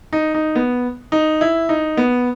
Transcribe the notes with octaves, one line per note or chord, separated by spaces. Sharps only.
D#4
D#4
B3
D#4
E4
D#4
B3